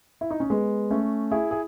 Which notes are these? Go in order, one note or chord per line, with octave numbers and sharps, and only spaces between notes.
E4
D#4
C#4
G#3 B3
A3 C#4
E4 G#4
G#4